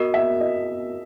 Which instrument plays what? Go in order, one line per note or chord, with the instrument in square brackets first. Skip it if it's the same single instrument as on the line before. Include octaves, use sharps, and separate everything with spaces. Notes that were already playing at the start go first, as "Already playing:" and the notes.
Already playing: [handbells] B3 F#4 A#4 [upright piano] D#5
[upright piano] E5
D#5